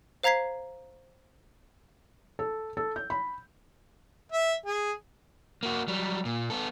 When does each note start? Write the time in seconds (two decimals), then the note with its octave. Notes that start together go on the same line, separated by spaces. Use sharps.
0.23 C5 F5 A#5 G#6 B6 C7
2.39 A4
2.77 A4
2.96 G6
3.10 B5
4.32 E5
4.66 G#4
5.63 A#3 F#4
5.88 F#3 G3
6.25 A#2
6.50 B3 A4